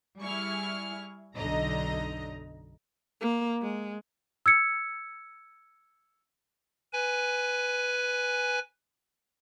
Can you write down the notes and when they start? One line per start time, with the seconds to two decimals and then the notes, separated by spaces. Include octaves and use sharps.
0.20 G3 E4 G#4 C#6 F6
1.37 B1 F#2 D3 D#4 D#5 A#5
3.20 A#3
3.61 G#3
4.46 E6 G#6 C#7
6.93 B4 G#5